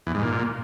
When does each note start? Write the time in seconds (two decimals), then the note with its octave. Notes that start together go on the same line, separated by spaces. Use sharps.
0.07 E2
0.15 G#2
0.23 A#2